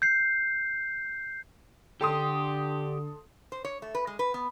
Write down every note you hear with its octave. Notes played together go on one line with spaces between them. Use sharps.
G6 C7
D3 G4 A4 C6 D#6
C5
C#5
A3
B4
G#3
B4
B3